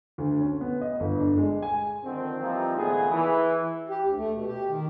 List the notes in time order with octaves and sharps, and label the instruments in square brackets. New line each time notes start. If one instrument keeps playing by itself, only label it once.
[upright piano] D2
C#4
B3
D#5
G1
D4
G#3
G#5
[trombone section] D3 D#3 F3 C4
E3 F3 G3 A#3 C4 D#4
C#2 A#2 D#3 A3 B3 G#4
E3
[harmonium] G4
D2
A3
B2
G4
D#3